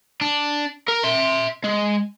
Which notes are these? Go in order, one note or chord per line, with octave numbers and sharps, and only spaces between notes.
D4
A#4
E5 C6
G#3